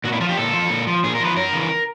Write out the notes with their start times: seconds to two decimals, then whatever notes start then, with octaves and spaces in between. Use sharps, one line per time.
0.04 A#2 F#4
0.12 E4
0.20 F3 F4
0.29 G4
0.37 A#2 A4
0.54 F3
0.70 A#2
0.87 F3
1.04 A#2 G#4
1.15 A#4
1.20 F3 B4
1.36 F#2 A#4
1.53 C#3 E3